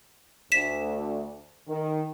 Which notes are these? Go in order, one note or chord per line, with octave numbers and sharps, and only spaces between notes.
D2 B6 E7
D#3